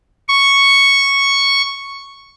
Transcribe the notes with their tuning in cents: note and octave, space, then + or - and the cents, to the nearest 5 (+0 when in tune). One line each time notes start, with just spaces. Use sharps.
C#6 +0